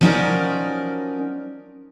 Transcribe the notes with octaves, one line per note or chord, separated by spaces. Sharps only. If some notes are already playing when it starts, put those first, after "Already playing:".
F3 F#3 C#4 D#4 A#4 D5